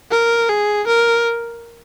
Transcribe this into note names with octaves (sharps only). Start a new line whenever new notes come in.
A#4
G#4
A#4